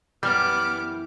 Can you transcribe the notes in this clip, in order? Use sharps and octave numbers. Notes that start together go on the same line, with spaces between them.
F#2 E3 G3 B3 D6 F6